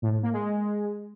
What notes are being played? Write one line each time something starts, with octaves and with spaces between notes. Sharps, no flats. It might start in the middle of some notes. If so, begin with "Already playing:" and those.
A2
A2
A#3
G#3